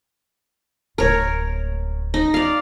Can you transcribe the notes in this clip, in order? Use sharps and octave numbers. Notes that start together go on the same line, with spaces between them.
D1 G#3 A#4 C#5
D#4
D5 F5